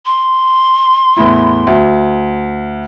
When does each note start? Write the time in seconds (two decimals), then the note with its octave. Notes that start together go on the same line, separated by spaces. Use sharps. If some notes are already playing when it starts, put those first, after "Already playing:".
0.06 C6
1.17 E2 A2 E4
1.67 D2